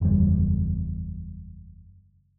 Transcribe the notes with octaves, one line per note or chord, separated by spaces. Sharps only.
F#1 E2 A2 G3